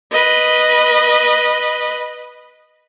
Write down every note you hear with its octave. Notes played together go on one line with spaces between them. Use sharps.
B4 D#5